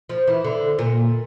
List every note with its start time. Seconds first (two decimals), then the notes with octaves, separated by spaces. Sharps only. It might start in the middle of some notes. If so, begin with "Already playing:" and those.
0.09 F3
0.27 E3
0.44 D3
0.79 A#2